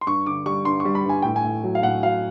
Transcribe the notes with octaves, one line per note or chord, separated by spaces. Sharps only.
C6
G2 C#6
D3 D6
G3 C#6
G2 C6
C#6
G3
B5
G2 G#5
A2 G5
G#5
A2
F#3
F5
A2 F#5
F#3 F5